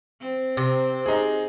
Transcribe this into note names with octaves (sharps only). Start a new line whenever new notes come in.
C4
C3
D#4 G#4